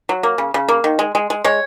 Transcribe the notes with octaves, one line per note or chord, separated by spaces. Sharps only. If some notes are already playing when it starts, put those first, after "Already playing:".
F#3
A#3
C#3
C#3
A#3
D#3
G#3
G#3
G#3
G#3 C#5